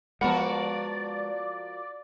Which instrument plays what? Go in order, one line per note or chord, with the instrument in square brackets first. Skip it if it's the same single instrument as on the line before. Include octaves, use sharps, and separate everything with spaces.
[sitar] F3 F#4 A#4 [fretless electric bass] G#3 B3 [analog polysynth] D5 [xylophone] F#5 B5